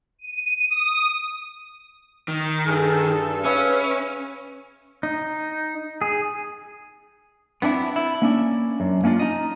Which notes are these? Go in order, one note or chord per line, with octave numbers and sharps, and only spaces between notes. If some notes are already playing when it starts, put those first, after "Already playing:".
D#7
D#6
D#3
G2 G#4 A4
C#4 G#4 B4 E5 F5
D#4
G#4
B3 C4 D4 E4
E4
A#3 C#4 D4
F#2
A#3 C#4 D4 F4
D#4 D#5